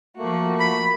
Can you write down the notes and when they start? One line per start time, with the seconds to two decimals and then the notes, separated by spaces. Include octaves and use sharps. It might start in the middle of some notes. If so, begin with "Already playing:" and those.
0.17 F3 A3 A#3 F#4
0.60 B5